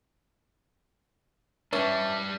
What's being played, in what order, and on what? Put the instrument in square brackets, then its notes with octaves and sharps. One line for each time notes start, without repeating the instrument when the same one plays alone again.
[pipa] E3 C#4 E5 [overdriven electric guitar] G3 D4